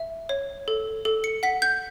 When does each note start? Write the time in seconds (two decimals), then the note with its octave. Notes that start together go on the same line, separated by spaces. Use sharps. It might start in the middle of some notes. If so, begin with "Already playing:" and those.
Already playing: E5
0.29 C#5
0.68 A4
1.05 A4
1.24 C#7
1.43 F#5 B6
1.62 G6